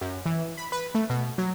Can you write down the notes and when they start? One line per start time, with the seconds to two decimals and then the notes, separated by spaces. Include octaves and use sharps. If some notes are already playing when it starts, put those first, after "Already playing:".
0.01 F#2
0.26 E3
0.57 B5
0.72 B4
0.95 A3
1.10 B2
1.38 F#3